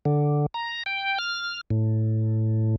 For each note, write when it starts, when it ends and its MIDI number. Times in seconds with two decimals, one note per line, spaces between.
0.05 0.46 50
0.54 0.83 82
0.86 1.18 79
1.19 1.61 89
1.70 2.76 45